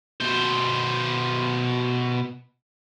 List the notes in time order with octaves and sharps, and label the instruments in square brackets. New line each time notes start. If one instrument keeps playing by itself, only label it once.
[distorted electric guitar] B2 C5